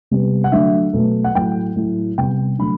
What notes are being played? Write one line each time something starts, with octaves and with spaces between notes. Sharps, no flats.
C3 G3 B3
F#5
D3 F#3 A3 E5
B2 F#3 A3
F#5
A2 F#3 A3 G5
A2 F#3 A3
C3 G3 B3 G5
D3 F#3 A3 B5